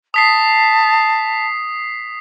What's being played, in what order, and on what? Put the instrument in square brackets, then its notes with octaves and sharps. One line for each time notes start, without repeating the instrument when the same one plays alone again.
[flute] A5 [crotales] D#6 B6 C7